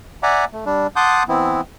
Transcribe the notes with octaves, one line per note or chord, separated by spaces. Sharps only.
D5 E5 F#5 G#5 A#5 D6
A3
G3 D4
F#5 A5 C6 D6 D#6 G6
E3 B3 C4 E4